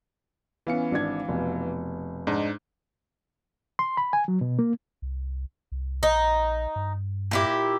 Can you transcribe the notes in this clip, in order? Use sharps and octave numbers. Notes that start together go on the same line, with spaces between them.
E3 B3 C#4 F5 C#7
G#1 D4 G#6
F1 B2
G#2 D4 D#4
C6
B5
G#5
F#3
B2
A#3
C2
C2
A#1 D#4
G2
A#2 E4 G4